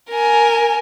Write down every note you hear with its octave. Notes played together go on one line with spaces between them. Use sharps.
A#4 G#5